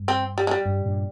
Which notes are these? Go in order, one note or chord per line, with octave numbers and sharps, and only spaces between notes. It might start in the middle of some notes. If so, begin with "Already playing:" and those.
Already playing: G2
C4
G3
G#3
G3
G2
G2 A#2